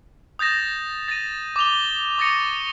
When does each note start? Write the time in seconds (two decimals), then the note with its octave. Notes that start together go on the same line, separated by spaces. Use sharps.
0.39 D#6 G6 A6 A#6 E7
1.08 A6 A#6 D#7
1.56 D6 E7 F7 G7
2.18 C#6 D#6 A6 A#6 C#7 D#7